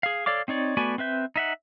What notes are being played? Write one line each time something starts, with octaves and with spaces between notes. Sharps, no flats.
G#4 F5
A4 C#5 D5 F5 D6
C4 D#4 C#5 D5
A3 B3 F#4 D5 G#5
C4 B4 E5 G6
D#4 E5 F#5